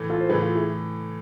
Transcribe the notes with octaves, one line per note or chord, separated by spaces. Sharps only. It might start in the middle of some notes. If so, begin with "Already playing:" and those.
Already playing: A2 E3 A3
F4 A4
C5
A2 E3 A3 G#4 B4
F4 A4
E4 G#4